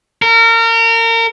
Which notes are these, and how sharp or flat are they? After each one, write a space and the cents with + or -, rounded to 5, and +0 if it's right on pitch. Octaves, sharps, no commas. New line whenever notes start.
A#4 -30